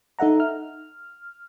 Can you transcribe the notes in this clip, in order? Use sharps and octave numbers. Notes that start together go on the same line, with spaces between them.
D#4 A4 E5 F#5 A#5
F6